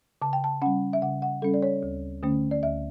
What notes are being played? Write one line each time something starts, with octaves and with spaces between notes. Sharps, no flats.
C#3 A5
G5
A5
G3 C#4 F#5
E5
C#3 F#5
F#5
G3 C#4 A4
D5
C#5
D2
D3 A3 C#4
D5
D2 E5